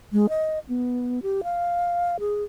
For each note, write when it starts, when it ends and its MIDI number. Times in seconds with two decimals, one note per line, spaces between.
0.12 0.27 56
0.29 0.59 75
0.69 1.20 59
1.23 1.41 67
1.44 2.16 77
2.20 2.44 68